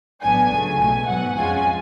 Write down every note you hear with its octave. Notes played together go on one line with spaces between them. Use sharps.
A1 A2 F#3 B3 D4 G#5
C#2 C#3 F#3 A3
B1 B2 A3 G#5
G#2 F#3 B3 F#5
F2 F3 G#3 C#4 F4 G#5